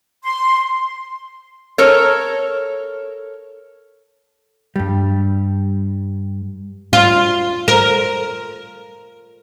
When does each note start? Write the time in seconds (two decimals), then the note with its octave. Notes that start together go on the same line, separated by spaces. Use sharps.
0.23 C6
1.78 A4 A#4 C#5
4.76 G2 G3
6.93 F4
7.68 A#4